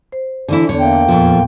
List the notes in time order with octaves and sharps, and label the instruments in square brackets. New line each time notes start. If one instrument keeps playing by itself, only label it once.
[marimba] C5
[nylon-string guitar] D3 E3 E4
[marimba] E2 B3 [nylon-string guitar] D3 C#5
[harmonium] A#3 G5 [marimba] E5
[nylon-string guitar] F2 F3 [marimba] A#2 B3